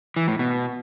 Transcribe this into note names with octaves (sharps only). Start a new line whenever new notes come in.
E3
A2
B2